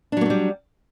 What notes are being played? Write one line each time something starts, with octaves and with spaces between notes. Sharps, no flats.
F#3 G3 A3 A#3 D4